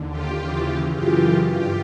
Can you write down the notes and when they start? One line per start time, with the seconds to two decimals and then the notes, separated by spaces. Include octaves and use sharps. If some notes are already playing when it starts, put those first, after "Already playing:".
Already playing: D#2 D3
0.10 F4 G4
0.38 D#2 C#3 E3
0.94 F#2 C#3 E3 F4 G4
1.50 G2 F4 G4